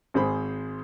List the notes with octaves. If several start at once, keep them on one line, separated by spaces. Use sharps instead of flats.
G#1 G#3 C5 B5